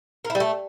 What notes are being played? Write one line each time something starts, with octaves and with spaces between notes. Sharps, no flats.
A#4
E4
G3
A3